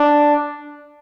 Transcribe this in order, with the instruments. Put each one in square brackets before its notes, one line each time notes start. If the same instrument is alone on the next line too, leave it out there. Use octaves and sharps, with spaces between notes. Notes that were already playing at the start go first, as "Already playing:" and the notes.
Already playing: [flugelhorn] D4